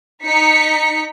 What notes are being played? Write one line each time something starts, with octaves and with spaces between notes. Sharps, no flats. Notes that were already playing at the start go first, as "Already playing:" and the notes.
D#4 B6 C#7